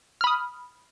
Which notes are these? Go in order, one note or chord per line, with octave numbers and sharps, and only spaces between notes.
B5 D#6 F6